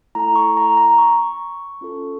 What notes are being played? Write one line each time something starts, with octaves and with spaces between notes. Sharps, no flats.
A3 E4 A4 A#5
C#6
A#5
A#5
C#6
C#4 F4 A4